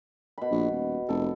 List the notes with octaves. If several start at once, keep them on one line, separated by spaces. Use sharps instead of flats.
B2 B5
A#1
D#1
F1 A4